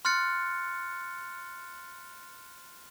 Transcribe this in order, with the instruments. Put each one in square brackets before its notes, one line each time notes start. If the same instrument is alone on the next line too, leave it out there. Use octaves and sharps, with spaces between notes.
[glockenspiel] C6 F6 F#6 A6 C#7